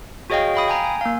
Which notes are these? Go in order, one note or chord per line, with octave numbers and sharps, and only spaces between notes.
F#4 G#4 C#5 D#5 F5 G5
F5 B5 D#6
G5 G#5 A#5
G#5
A#3 F5